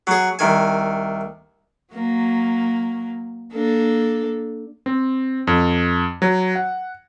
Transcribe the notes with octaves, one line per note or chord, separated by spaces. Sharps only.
F#3 G#4
C2 D#3 G#5
F#3 A#3
A#3 D4 A4
C4
F2
F#3
F#5